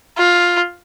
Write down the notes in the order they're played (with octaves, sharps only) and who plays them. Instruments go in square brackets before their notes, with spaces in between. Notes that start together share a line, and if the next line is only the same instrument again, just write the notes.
[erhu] F4